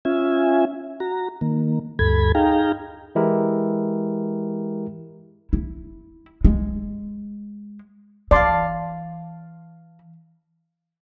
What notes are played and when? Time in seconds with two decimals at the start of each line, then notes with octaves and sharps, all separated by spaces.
0.05 C#4 F4 E5 G#5
1.00 F#4 A#5
1.41 D#3 A#3
1.99 D2 G2 A4 B5 G#6
2.35 D#4 G#4 F5 G5 A#5
3.15 E3 G#3 E4 G4 A#4
5.53 E4
6.45 G#3
8.31 E3 D5 F5 A5 C6